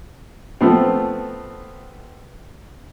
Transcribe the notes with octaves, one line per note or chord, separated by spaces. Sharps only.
F3 A3 B3 C4